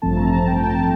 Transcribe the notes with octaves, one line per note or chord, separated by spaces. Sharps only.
A1 G2 F3 A3 C4 A5
A#5
A5
G5
A5